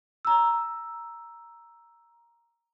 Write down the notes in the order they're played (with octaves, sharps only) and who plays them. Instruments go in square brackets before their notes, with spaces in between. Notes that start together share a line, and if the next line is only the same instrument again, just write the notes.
[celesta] A#5 E6